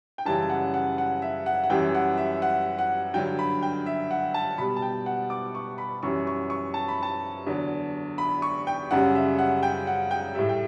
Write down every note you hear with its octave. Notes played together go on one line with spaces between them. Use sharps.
G5
F#2 C#3 E3 G3 A5
F#5
F#5
F#5
E5
F#5
F#5
F#2 E3 G3 G5
F#5
E5
F#5
F#5
G2 D3 F#3 G5
B5
G5
E5
F#5
A5
B2 G3 B5
A5
G5
F#5
D6
C#6
B5
F#2 E3 G3 C#6
C#6
C#6
A5
B5
A5
E2 D3 F#3
B5
C#6
G5
F#2 C#3 G3 F#5
E5
F#5
G5
F#5
G5
A2 G3 E5
G5